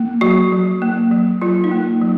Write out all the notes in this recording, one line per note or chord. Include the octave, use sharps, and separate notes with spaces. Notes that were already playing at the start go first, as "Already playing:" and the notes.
Already playing: A#3
F#3 F#4
F#3
A#3
F#3
F#3 F4
D#4
A#3
F#3